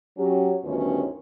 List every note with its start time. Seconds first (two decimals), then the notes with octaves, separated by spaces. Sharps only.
0.18 F#3 C#4 G4
0.63 D2 G2 D#3 B3 C#4 F4